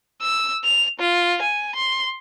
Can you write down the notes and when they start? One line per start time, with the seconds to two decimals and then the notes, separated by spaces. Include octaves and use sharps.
0.22 E6
0.65 F7
1.00 F4
1.42 G#5
1.76 C6